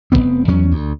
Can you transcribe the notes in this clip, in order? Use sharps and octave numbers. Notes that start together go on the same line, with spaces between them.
F1 G#2 B3 C4
E2 F#3 C#4
D2